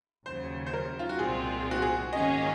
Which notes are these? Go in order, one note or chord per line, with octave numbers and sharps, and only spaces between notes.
D#2 C#3 F#3 C5
C5
A#4
F4
F#4
C2 A#2 G#3 C4 F4 G#4
F#4
G#4
G#2 D#3 A#3 C#4 G#4 D#5